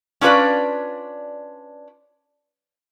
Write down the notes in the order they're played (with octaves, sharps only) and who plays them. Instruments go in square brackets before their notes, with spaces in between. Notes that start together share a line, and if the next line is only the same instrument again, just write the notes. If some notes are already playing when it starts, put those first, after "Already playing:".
[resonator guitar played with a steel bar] C#4 D4 F4 B4 D5